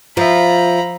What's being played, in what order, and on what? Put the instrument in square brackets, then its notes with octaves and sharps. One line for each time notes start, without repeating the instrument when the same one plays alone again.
[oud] F3 [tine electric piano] F4 E5 [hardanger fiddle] A#5 B5